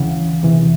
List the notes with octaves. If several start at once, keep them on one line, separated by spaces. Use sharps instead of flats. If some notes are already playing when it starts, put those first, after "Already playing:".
Already playing: D2 C#3 E3 F#5
E2 C3 E3